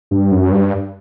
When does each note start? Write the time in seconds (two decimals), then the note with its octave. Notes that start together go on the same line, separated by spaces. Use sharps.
0.11 G2
0.32 F#2
0.52 G2